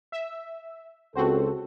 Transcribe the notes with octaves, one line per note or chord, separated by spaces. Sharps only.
E5
C#2 C4 F#4 A4 C5